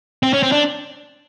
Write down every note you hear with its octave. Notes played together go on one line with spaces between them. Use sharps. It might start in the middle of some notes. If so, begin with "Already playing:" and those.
C4
C#4
C4
D4